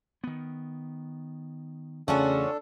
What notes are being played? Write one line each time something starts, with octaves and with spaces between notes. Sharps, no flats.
D#3 B3
E2 C#3 A3 C#4 D4 F4 F#4 A4